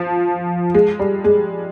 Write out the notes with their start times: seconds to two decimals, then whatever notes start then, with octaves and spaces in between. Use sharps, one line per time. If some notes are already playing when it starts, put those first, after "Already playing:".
Already playing: F3
0.74 G#3
0.99 G3
1.24 G#3